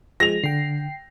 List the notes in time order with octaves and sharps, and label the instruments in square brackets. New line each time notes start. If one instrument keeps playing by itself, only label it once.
[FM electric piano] F3 G#3 [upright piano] A#6 F7
[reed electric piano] D3 [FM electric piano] G5 C7